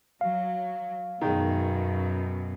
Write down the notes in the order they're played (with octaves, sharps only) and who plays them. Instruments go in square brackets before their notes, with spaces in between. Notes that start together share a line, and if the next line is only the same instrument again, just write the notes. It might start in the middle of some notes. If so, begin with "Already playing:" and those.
[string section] F#3 [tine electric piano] F5
[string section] F#2 B2 [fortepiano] D#3 G#3